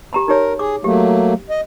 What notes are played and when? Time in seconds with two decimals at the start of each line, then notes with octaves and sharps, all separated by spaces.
0.13 G4 A#5 B5
0.28 D#4 G4 A#4 C#5
0.59 G#4 D6
0.84 F#3 A3 A#3 G4
1.50 D#5